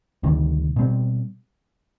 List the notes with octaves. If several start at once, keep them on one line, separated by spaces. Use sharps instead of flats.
D2 C3 D#3 G3
B2 G3 C4